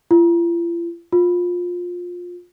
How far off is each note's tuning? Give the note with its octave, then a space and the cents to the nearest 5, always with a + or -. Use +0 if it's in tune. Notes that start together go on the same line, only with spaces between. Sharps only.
F4 -45
F4 +20